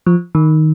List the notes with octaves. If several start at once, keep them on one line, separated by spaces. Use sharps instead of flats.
F3
D#3